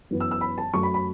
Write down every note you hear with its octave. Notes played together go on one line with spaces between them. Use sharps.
F#2 E3 B3
E6
E6
B5
A5
F#2 F#3 A3 C#6
B5
B5